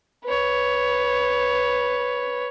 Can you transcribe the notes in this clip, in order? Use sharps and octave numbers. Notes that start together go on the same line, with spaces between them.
B4 C#5